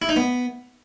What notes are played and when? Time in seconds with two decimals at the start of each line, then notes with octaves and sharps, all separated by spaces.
0.02 E4
0.09 D#4
0.16 B3